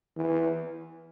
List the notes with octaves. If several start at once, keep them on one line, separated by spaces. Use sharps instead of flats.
E3